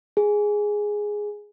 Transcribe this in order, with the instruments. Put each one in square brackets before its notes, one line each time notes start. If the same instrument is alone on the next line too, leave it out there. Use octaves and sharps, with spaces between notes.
[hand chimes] G#4